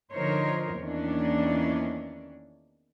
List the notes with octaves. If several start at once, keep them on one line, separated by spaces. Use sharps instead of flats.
D3 F3 D#4 A#4 C5 C#5
E2 D#3 E3 A#3 C#4 D4